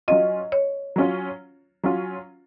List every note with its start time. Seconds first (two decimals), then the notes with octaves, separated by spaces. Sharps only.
0.08 F#3 C#4 F4 D#5
0.52 C#5
0.96 F#3 C#4 F4
1.83 F#3 C#4 F4